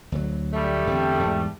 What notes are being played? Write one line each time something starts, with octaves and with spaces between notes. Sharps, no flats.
D2 F#3
G3 A3
E2 D3 C4
E2 G#2